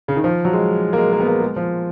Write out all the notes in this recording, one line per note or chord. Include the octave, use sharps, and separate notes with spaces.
C#3
D#3
F3
F#3
G#3
A#3
G#3
A#3
B3
A#3
G#3
F3